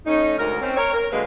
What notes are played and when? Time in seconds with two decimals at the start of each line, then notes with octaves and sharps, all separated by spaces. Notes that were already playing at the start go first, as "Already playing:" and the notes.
0.05 A3 C#4 D#4
0.38 D2 G#2 A#4
0.60 C4 C#4
0.75 A#4 C#5
0.93 A#4
1.11 D3 F#3 G#3 A#3 B4